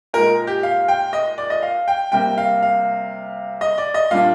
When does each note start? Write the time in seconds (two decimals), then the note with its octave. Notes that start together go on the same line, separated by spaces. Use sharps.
0.14 A#2 G#3 D#4 A#4
0.47 G4
0.63 F5
0.88 G5
1.13 D#5
1.38 D5
1.50 D#5
1.63 F5
1.88 G5
2.12 C3 G3 A#3 G5
2.38 F5
2.63 F5
3.61 D#5
3.78 D5
3.94 D#5
4.11 A#2 G3 D4 F5